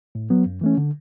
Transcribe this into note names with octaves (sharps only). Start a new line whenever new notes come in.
A2
F#3 B3
F#2
E3 A3 C#4
D3